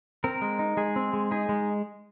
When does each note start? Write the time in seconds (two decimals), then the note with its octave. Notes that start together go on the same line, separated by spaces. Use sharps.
0.24 C4 A#4
0.42 G#3
0.59 D#4
0.77 G#3 G#4
0.96 C4
1.13 G#3
1.31 D#4 G#4
1.49 G#3